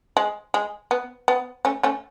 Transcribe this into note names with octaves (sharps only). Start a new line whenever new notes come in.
G#3
G#3
B3
B3
A3 C#4
A3 C#4